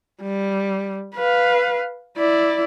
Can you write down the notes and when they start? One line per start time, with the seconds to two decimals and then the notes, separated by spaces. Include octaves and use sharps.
0.22 G3
1.15 B4 F5
2.17 E4 D5